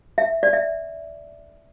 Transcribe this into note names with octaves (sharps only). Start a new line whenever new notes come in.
E5
D5
E5